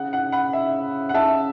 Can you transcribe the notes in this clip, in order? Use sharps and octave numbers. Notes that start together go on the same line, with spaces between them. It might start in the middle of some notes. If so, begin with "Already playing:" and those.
Already playing: C#3 F#5
F#5
F#5 B5
E5
F#5
C#3 E5 A5